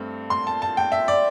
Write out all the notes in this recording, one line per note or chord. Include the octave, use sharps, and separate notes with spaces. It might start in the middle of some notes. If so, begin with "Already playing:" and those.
Already playing: G2 A3 C4
C6
A5
A5
G5
E5
D5